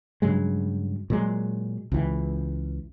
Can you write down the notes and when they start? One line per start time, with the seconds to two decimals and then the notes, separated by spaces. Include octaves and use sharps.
0.22 G2 C#3 F#3 G#3
1.10 A#2 F#3 G#3
1.92 C#2 E3